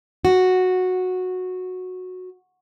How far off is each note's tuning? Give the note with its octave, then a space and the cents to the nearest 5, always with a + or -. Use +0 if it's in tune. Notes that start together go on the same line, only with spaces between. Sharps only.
F#4 -10